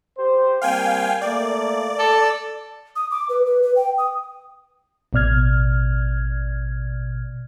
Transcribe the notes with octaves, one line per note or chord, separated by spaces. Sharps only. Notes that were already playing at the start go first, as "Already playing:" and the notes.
G4 C5
G3 A#3 C4 F5 G5 G#5
A3 A#3 D5
A4
D#6
D6
B4
B4
B4
G5
D#6
A1 B2 D5 F6 G#6